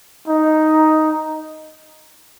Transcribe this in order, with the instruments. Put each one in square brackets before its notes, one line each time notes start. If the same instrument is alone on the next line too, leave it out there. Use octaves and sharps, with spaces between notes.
[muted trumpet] D#4